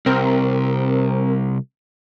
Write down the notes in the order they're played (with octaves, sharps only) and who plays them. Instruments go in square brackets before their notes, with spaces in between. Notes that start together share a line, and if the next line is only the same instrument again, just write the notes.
[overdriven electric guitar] C2 [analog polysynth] C4 A#4